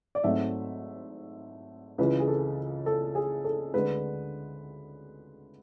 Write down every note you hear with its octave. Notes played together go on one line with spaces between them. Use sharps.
D5
G#1 G#2 F#3 A3 E5
C#2 C#3 E3 B4
G#4
A4
A4
G#4
A4
D2 D3 G#3 B4